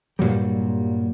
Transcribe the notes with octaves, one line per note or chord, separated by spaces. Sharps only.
G2 A#2 F#3 G3